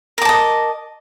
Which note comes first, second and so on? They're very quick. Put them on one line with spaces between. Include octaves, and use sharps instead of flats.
A#4 D6 A5 D#5